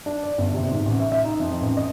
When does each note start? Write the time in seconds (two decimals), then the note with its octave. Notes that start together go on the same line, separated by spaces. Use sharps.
0.06 D4
0.24 D5
0.38 G1
0.54 C3
0.71 G#2
0.85 A1
1.00 E5
1.12 E5
1.24 D#4
1.40 F2
1.61 A1
1.77 D#5